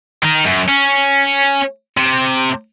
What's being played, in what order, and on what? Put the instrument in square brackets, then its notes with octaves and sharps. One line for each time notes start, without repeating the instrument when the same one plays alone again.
[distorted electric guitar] D#3 D#4
F#2
C#4
C3